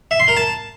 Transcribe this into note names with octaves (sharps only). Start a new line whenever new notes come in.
E5
C6
A#4
A5